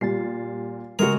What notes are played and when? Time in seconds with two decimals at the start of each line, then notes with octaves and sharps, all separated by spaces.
0.01 A#2 G3 A6 C7
0.99 C#3 G#3 A3 F#4 A#4